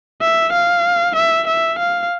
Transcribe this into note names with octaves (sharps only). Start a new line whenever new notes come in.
E5
F5
E5
E5
F5